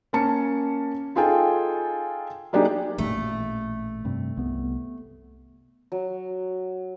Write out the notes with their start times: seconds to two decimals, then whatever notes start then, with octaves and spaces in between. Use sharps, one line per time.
0.13 A#3 C#4 A5 C#7
1.15 D#4 F4 G#4 A4 G5 G#5
2.53 F#3 A#3 D4 D#4 G4 G#4
2.98 A1 A#2 A3
4.05 G2 C3
4.37 C2 B3
5.92 F#3